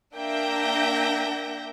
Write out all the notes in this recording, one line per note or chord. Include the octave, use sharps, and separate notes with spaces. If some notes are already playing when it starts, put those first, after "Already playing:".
A#3 D4 E5 G5 G6 A#6